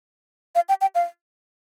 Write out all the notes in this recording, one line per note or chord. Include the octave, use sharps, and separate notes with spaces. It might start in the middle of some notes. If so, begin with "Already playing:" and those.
F5
G5
G5
F5